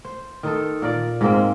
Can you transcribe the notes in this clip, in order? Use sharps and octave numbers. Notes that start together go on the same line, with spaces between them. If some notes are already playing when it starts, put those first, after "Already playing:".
C5
D#3 D#4 A4
A#2 A#4 D5
G#2 G#3 A#3 C4